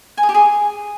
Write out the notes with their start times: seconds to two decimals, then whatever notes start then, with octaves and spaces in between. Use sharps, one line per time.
0.17 G#5
0.23 G#4
0.29 G4
0.34 G#4